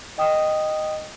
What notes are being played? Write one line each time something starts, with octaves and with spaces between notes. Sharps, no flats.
D#5 G5 D#6